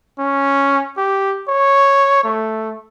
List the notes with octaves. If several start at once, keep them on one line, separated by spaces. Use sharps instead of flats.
C#4
G4
C#5
A3